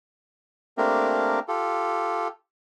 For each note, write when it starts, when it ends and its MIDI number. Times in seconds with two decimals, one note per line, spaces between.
0.78 1.39 57
0.78 1.39 58
0.78 1.39 60
0.78 1.39 62
0.78 1.39 67
0.78 1.39 70
1.48 2.28 65
1.48 2.28 67
1.48 2.28 69